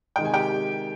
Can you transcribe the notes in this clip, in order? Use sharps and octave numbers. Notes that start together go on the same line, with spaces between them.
C3 D#3 G#3 G5
G#5
G4 G5